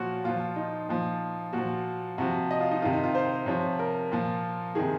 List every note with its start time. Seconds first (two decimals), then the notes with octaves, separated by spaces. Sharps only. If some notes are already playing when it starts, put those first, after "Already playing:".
Already playing: A#2 F3 F#4 C#5
0.24 A#2 F3 F4
0.56 D#4
0.89 A#2 F3
1.53 A#2 F3 F#4
2.18 C3 F3 F#4
2.51 D#5
2.60 F4
2.71 D#4
2.82 D#3 F4
2.85 C3
2.93 D#4
3.04 F4
3.15 C5
3.46 C3 F3 C#5
3.79 A#4
4.12 A#2 F3
4.75 C3 D#3 G#4